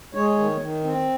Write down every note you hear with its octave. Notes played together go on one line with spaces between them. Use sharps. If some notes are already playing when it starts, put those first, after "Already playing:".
G#3 C#5
D#3
D#3
C4